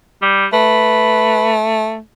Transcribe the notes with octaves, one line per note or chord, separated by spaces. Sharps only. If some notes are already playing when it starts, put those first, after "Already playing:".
G3
A3 B4